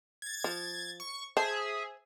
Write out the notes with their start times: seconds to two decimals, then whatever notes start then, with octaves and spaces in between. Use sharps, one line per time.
0.22 G#6 A6
0.44 F3
1.00 C#6
1.37 G#4 C5 E5 A5